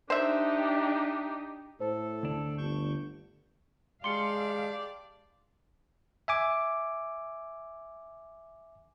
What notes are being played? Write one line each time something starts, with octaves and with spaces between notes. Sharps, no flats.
D4 D#4 G4 C5 E5
A2 A4 C5
D2 D4
G1 C#6 G6
G#3 G4 D5 F5 A5 C6 C#7
E5 G#5 D6